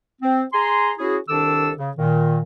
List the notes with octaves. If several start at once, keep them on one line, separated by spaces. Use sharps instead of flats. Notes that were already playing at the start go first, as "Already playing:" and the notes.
C4
G#4 G#5 A#5 C6
C#4 E4 F#4 G#4
C2 D#3 D4 A4 D6 E6
C#3
A#2 D#3